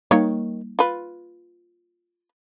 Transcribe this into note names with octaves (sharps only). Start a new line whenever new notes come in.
D#3 G3 A#3 D#4 C#5
F4 B4